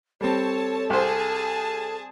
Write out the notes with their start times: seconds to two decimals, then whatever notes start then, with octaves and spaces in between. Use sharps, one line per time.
0.21 G3 C4 A4 C#5 A5
0.90 C2 G#4 C5 A5